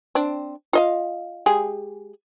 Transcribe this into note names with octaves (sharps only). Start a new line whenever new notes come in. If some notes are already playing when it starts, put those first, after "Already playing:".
C4 D4
F4 D#5 F5
G#3 G4 G#4